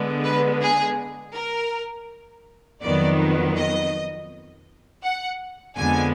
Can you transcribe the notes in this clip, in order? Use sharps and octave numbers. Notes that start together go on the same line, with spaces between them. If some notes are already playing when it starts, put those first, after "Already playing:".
Already playing: D3 G#3 B3
B4
G#4
A#4
F2 D#3 F#3 B3 D5
D#5
F#5
F2 D3 G#3 B3 G#5